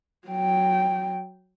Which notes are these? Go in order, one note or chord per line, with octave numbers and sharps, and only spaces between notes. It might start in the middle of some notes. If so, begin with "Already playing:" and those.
F#3 G5